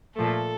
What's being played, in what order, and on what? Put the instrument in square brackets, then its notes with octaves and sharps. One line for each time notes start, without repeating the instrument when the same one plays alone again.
[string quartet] A#2 F3 A3 A4